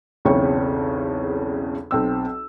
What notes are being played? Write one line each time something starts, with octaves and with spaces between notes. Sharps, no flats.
B1 E2 C#3 C4 C#5 C#6
B1 C4 E6